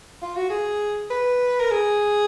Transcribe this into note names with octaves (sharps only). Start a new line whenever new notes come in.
F4
F#4
G#4
B4
A#4
G#4